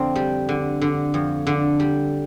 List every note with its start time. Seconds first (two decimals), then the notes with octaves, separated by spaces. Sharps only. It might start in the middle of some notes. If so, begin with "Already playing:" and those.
Already playing: F2 D3 C4 D4
0.15 G3
0.49 D3
0.81 D3
1.14 F2
1.47 D3
1.80 G3